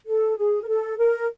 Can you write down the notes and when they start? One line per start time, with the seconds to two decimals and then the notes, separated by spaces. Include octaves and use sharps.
0.07 A4
0.37 G#4
0.62 A#4
0.68 A4
0.98 A#4